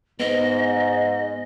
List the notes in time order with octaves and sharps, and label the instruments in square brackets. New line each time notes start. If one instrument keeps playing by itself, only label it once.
[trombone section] G#2 [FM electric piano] B3 [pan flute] D#5